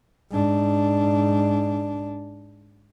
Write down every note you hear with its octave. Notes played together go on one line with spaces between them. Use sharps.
G#2 D4